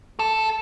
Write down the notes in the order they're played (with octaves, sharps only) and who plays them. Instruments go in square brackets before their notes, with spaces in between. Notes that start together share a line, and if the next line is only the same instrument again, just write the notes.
[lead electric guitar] A4